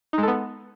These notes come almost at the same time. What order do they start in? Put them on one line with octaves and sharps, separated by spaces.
D#4 G#3 A4 B3